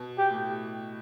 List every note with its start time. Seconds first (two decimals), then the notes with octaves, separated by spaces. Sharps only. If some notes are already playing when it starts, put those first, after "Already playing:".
Already playing: B2
0.18 G4
0.31 A2